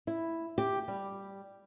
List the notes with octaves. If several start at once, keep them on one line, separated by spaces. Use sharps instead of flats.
E4
G4
G3